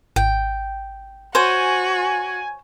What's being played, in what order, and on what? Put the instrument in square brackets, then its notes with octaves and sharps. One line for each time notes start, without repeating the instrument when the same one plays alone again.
[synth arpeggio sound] G#1 [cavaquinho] G5
[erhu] F#4 [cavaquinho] C5 C#5 [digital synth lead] G#5